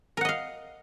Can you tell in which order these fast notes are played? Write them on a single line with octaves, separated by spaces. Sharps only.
A#4 F#5 D#5 F5